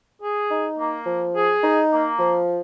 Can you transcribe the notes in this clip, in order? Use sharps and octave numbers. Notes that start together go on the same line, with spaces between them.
G#4
D#4
A#3
F3
G#4
D#4
A#3
F3